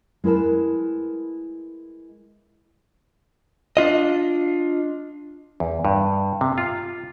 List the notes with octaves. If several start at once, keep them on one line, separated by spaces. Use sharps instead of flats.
G#3 E4 A#4 B4 A5
D4 F4 D#5
E2
G2
C3
F4